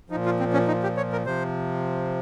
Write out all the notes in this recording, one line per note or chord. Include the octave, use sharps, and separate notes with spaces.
F3 D#4
A#2
F4
C4
C#4
D#4
G4
C#5
A#4
C3 F3 C5